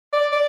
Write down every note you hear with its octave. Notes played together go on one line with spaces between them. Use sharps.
D5
D5